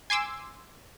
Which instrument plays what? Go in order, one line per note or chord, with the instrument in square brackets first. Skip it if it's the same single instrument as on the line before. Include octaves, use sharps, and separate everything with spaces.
[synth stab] G#5 C6 D6 E6